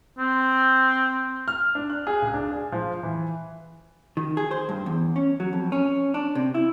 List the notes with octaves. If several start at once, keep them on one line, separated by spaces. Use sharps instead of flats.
C4
F6
D4
F#6
G#4
C#2
D4
G#4
F3
E3
D#3
G#4
C5
G2
E2
C#4
F#3
F2
C#4
D4
C3
E4